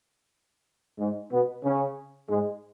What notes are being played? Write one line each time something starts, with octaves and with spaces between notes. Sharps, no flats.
G#2 G#3
B2 B3
C#3 C#4
G#2 G#3